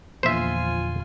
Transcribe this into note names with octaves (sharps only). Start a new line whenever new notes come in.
E2 A#2 D3 F3 F4 C5 E5 G#5